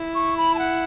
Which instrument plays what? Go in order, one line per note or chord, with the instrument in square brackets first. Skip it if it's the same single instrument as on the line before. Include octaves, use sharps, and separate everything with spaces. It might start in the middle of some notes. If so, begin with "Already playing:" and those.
Already playing: [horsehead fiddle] E4
[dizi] C#6
B5
A5
F#5